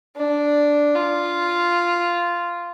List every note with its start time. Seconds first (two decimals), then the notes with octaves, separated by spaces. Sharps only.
0.17 D4
0.95 F4